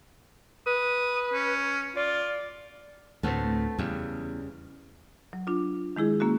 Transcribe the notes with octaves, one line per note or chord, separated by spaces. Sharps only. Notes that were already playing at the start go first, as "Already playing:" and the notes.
B4 D#6
C#4
F4 D5
D2 A2 A3 B3 C4
E2 C#3 G3
F#3
D4 F4
D#3 G#3 E4 G#4
A#3 C#4 F#4